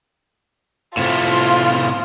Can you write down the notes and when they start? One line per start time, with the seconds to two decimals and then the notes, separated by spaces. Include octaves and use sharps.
0.97 A2 C3 A3 F4